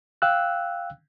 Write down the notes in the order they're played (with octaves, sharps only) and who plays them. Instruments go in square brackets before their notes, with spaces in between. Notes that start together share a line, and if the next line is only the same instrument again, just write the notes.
[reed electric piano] F5 G5 E6 F#6